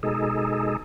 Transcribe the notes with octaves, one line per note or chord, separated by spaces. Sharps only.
B2 G#3 D#4 G#4 A4